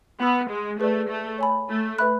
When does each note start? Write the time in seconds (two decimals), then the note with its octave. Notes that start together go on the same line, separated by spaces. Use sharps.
0.20 B3 F#5 B5 E6
0.50 G#3
0.80 A3 G#4 B4 D5
1.09 A3
1.38 C#5 G#5 B5
1.69 A3
1.98 B4 E5 B5 F#6